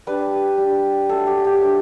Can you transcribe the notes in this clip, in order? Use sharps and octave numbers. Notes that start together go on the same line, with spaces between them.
G3 D4 B4
G3
D4
F#3 A3 D4 A4
G4
G4
F#3 A3 D4